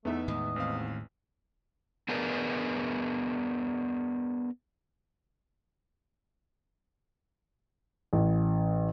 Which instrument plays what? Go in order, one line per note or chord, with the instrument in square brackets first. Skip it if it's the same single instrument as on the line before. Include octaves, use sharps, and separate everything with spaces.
[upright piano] E2 D#4 [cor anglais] A3 [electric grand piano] B3 E5
[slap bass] A2 D#3 G#3 [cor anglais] D#5
[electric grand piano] A1 C4 F5
[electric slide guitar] B3 D4 G#4 A#4 B4
[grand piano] A1